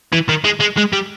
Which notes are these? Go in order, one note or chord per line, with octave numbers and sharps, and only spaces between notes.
E3
D#3
G#3
G#3
G#3
G3